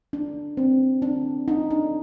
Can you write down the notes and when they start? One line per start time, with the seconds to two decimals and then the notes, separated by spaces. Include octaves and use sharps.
0.13 D4
0.57 C4
1.02 D4
1.48 D#4
1.70 D4